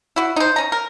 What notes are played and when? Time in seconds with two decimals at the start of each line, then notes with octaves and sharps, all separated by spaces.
0.16 E4 F#4
0.36 D#4 C5
0.56 C#4 A#5
0.72 A#4